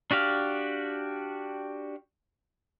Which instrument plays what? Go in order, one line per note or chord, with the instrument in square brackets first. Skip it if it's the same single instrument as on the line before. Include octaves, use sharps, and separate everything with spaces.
[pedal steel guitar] D4 F#4 G4 F5